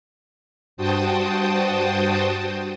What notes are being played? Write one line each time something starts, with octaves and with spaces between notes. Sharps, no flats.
G2 F#4 C5 G5 A5 D#6